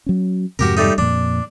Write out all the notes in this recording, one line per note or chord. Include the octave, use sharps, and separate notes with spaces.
F#3 C#4
F2 G#2 C3 F#4 G4 A#4
G3 A3 D#4
F2 A#2 D4